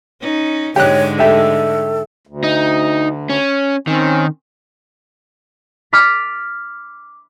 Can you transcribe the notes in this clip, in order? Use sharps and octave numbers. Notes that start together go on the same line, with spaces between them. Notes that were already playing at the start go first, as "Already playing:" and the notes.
C#4 D#4
G#2 D3 G#3 G4 C#5 F#6
A3 G4 A4 E5
D2
D#4
C#4
D#3 C4 C#4
B5 D6 F6 A6 B6